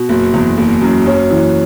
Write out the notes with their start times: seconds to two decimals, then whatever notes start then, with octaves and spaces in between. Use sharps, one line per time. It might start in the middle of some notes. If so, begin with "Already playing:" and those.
Already playing: B2
0.09 F#1
0.34 E2
0.57 F#1
0.81 F#2
1.06 F#2 C#4
1.31 E3